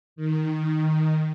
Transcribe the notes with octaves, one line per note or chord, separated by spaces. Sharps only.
D#3